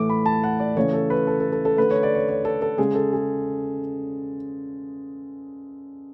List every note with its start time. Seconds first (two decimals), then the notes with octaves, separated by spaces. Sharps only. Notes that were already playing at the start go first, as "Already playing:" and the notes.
Already playing: A2 E3 A3 D6
0.10 B5
0.26 A5
0.44 F#5
0.60 D5
0.76 C#3 E3 A3 C#5
0.93 A4
1.10 B4
1.27 A4
1.40 A4
1.52 A4
1.65 A4
1.77 D3 A3 B4
1.91 C#5
2.03 D5
2.15 C#5
2.29 C#5
2.45 A4
2.62 A4
2.78 C#3 G#3 G#4
2.95 A4
3.13 G#4